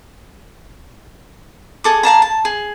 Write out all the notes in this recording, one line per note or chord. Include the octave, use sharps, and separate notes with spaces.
G#4 A4 D6
G#4 F5 A5 A#5
A5
G#4